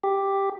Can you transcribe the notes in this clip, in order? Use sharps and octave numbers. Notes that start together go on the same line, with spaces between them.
G4